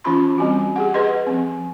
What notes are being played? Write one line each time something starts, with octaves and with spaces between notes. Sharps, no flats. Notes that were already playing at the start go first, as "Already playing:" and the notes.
E3 C#4 F4 B5 C6
G3 C4 F#4
G4 G#4 F#5
G4 G#4 B4 D#5 C6
F3 C4